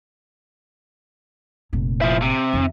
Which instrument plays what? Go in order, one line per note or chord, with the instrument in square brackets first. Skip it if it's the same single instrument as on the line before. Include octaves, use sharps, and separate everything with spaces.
[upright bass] F1 A#2
[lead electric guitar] F3 E4
C3
[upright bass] F2 D#3